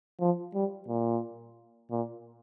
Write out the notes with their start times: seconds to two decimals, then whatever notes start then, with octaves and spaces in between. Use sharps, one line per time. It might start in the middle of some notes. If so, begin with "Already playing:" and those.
0.20 F3
0.54 G3
0.88 A#2
1.91 A#2